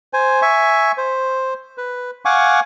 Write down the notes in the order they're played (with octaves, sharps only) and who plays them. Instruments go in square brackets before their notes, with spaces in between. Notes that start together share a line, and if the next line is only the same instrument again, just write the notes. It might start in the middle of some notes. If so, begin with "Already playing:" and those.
[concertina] C5 G#5
E5 G#5 C#6
C5
B4
F5 F#5 G#5 C#6 D6